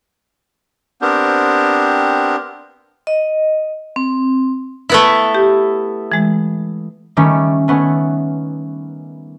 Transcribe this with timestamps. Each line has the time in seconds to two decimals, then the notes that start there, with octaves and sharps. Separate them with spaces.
1.02 B3 C4 D4 G4 A#4 C5
3.07 D#5
3.96 C4
4.89 A3 B3 E4
5.35 G4
6.12 E3 G#3
7.17 D#3 G3 A3 C#4
7.68 A3 B3 C#4